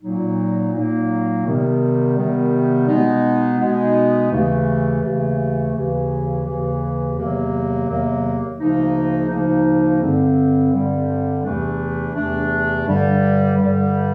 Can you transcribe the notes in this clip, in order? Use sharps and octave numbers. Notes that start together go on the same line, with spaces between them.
A#2 F#3 A#3 D#4
A#2 F#3 A#3 D#4
C3 D#3 G3 B3
C3 D#3 G3 B3
B2 G#3 B3 D#4
B2 G#3 B3 D#4
D#2 C#3 E3 A3
D#2 C#3 E3 A3
D#2 C#3 E3
D#2 C#3 E3
E2 C3 D#3 F#3 A#3
E2 C3 D#3 F#3 A#3
D2 C#3 F3 A#3 D#4
D2 C#3 F3 A#3 D#4
G2 D3 G3 C4
G2 D3 G3 C4
E2 C3 E3 A3 D4
E2 C3 E3 A3 D4
G2 D3 G3
G2 D3 G3